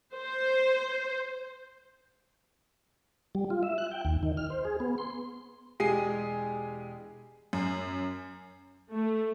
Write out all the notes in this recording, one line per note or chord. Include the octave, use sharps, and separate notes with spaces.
C5
G3
F4
E5
F#6
G5
D#2
D#3
F6
C5
G#4
B3
C6
E1 G#3 G4 G#4 C7 D#7
F#2
A3